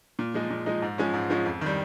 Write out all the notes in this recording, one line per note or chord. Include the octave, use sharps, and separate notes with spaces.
A#2
F3 G#3 D#4
A#2
F3 G#3 D#4
G#2
F3 G#3 C#4
G#2
F3 G#3 C#4
F2
D#3 G3